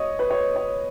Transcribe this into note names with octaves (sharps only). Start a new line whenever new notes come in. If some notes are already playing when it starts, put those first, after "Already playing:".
Already playing: C#5 D#5
B4
C#5
C#5